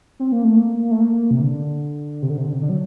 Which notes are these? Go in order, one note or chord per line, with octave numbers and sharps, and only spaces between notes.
C4
A#3
A3
A#3
A3
A#3
C3
D3
C3
D3
C3
D3
C3
D3
F#3